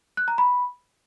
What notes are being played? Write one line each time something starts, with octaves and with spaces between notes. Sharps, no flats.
F#6
A#5
B5